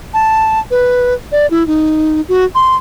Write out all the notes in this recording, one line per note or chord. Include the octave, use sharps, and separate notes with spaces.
A5
B4
D5
E4
D#4
F#4
C6